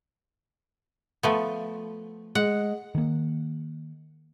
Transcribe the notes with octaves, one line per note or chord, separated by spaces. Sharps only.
F3 A3 B3
G#3 F#5
D#3 A#3